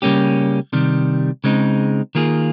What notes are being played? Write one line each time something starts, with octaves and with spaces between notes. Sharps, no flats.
C#3 G3 A#3 C#4 G4
C3 D#3 G3
C#3 G#3 C4 D#4
D#3 A#3 F4 G#4